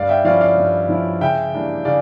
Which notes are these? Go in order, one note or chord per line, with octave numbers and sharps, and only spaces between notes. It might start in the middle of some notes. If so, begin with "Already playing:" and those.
Already playing: G2 D5 F5
E5 G5
F3 C#4 E4 D5 F5
D5 F5
G2
F3 C#4 E4
C#3 E5 G5
E3 G3 A#3 D4
C#3 D5 F5